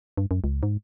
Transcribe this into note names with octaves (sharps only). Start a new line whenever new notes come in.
G2
F#2
C#2
G#2